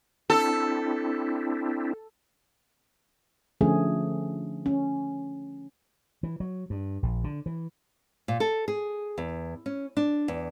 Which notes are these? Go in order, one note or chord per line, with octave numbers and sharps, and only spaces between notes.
C4 D4 E4 A4
D3 F3 A3 C#4 G#4
C#4
E3
F#3
G2
A#1
D3
E3
A#2
A4
G#4
E2
C#4
D4
E2